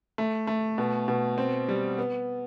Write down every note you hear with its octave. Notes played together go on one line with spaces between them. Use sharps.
A3
A3
B2
B2
C4
G3
B3